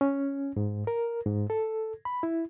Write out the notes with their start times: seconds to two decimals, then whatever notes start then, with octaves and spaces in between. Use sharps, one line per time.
0.01 C#4
0.57 G#2
0.87 A#4
1.25 G#2
1.50 A4
2.05 B5
2.23 E4